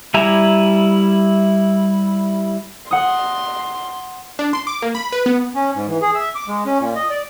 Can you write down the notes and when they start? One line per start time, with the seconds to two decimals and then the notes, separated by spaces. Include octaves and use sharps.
0.14 G3 E4 E5 G#5 A#5
2.91 F#5 C6 D#6
4.39 D4
4.53 C6
4.67 D6
4.82 A#3
4.95 B5
5.12 B4
5.26 B3
5.55 C#4
5.74 G#2
5.87 E3
6.02 G#4
6.14 E5
6.35 D6
6.48 G#3
6.66 C#4
6.80 A#2
6.95 D#5
7.10 D5